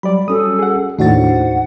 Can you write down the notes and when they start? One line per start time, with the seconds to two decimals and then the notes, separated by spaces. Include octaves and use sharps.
0.03 F#3 G3 D5 B5
0.28 G3 C#4 F#4 A4 D#6
0.59 G#4 F#5
0.99 D#2 A2 D4 D#4 F#4 C5 F#5 A6
1.29 D#4